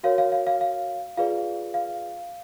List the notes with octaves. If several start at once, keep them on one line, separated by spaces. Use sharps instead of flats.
F#4 A#4 C#5 F5
F5
F5
F5
F5
F4 G#4 B4 D5 F5
F5